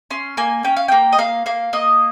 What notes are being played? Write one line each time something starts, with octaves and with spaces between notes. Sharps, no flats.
C#4 C6
A#3 G#5
C#4 G5
F5
A#3 G5
D#5
A#3 F5
A#3 F5
A#3 D#5